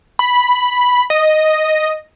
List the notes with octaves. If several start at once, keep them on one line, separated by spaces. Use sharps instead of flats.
B5
D#5